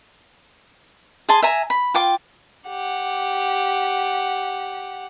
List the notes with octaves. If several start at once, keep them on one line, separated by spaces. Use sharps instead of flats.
G#4 G#5 A5 C6
E5 G#5 A#5
B5
F4 G5 D6
G4 F#5